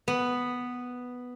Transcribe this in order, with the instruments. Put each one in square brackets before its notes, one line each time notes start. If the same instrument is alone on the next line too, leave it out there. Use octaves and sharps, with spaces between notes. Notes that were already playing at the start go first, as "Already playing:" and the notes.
[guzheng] B3